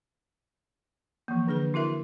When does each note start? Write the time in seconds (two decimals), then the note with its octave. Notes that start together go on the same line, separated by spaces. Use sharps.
1.28 E3 F3 A#3
1.47 D3 D4 G#4 B4
1.74 E4 F#4 A#4 E5